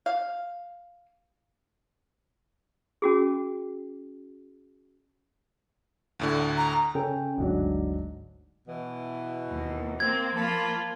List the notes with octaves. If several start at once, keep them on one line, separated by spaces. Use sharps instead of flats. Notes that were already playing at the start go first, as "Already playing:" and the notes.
F5
C#4 F#4 G#4
D2 A2 D3
A#5
C#3 C#4 A4 C#5 G5
G1 D2 G#2 F#3 D4
B2 E3
D#2
A#3 C4 G#6
F3 A#3 F4 A5 B5